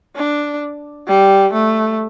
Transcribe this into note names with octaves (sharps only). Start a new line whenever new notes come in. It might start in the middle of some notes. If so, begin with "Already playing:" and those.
D4
G3
A3